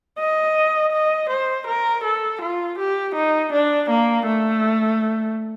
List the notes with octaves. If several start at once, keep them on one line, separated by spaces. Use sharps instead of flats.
D#5
D#5
C5
A#4
A4
F4
G4
D#4
D4
A#3
A3